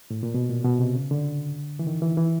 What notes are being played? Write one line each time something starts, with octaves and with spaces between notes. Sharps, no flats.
A2
A#2
B2
A#2
B2
C3
C#3
D3
E3
D#3
E3
E3